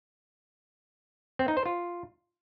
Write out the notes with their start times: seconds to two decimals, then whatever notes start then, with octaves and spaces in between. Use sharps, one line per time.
1.39 C4
1.48 D#4
1.57 C5
1.66 F4